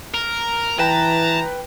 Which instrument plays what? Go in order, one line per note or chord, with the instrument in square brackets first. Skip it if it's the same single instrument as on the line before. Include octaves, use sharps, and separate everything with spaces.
[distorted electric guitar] A#4
[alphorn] E3 [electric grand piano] B4 G5 [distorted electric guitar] A5 [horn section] A#5